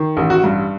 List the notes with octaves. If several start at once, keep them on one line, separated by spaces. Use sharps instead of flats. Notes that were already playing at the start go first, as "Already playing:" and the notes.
Already playing: D#3
A1
F#4
G2